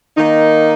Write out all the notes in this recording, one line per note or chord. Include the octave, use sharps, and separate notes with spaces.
D#3 A#3 D#4